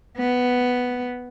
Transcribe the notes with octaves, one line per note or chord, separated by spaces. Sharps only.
B3